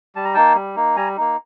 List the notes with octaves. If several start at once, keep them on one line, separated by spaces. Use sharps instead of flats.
G3 A5
A#5
A#3 D#4 G5 A5
G3
A#3 D#4
G3 G#5 A#5
A#3 D#4